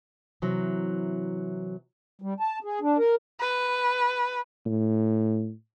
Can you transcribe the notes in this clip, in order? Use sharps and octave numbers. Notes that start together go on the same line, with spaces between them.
C3 E3 F#3
G3
A5
G#4
D4
A#4
B4
A2